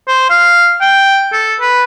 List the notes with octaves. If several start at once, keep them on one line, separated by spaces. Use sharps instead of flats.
C5
F5
G5
A4
B4